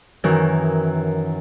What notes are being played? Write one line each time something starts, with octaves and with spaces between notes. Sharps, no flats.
F#2 D#3 E3